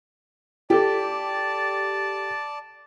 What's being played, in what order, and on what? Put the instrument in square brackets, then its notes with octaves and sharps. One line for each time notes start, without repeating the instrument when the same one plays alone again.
[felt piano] G4 A4 [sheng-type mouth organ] D5 A5